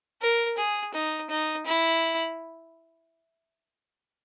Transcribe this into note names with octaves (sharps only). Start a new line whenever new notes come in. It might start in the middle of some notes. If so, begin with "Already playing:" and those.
A#4
G#4
D#4
D#4
E4